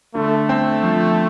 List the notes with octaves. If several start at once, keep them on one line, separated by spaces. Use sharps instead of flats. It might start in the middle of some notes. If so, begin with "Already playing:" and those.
D3 A3
C4
F3